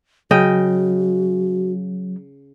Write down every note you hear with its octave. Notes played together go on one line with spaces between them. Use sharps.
C#3 F#3 F#4 D#5 G5